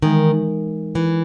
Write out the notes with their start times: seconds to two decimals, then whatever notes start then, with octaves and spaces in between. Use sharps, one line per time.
0.02 D#3 E3 G#3 D#4 A#4
0.95 E3